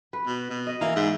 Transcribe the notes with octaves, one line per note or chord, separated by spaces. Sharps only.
B4
B2
B2
D#5
E3 A#3
G#2